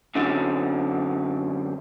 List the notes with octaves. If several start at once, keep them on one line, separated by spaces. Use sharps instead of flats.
F#2 D3 F#3 C4